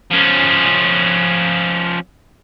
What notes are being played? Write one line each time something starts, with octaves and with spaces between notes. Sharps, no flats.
F3 C#4